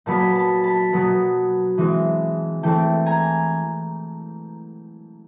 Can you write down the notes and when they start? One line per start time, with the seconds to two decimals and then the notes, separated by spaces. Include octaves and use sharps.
0.06 A#2 F#3 B3 A5 B5
0.35 A5 B5
0.64 A5 B5
0.93 B2 F#3 B3
1.78 E3 G#3 C4
2.63 E3 A3 C4 G5 A5
3.06 G#5 A#5